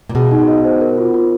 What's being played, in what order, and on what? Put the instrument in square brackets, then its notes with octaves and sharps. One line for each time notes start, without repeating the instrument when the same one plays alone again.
[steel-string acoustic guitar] A#2
[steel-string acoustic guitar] B2 [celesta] G#4
[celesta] D#4
D#5
C5
A#4
F4
F4